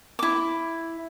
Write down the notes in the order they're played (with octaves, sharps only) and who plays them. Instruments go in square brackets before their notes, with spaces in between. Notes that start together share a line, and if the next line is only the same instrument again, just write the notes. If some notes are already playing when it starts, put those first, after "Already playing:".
[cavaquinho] E4 D6